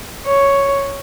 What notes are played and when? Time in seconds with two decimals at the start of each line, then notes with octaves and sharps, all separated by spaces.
0.26 C#5